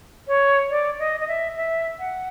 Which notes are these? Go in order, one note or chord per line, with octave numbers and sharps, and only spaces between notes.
C#5
D5
D#5
D#5
E5
E5
F#5